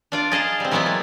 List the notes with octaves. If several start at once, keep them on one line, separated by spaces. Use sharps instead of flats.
D4 F4 D5
G#4 D#5 F5 A5 A#5
G3 C4
E3 F#3 G#3 B3 E4 F4
A#3